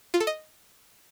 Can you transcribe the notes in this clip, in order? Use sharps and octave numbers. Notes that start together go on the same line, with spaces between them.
F4
A4
D#5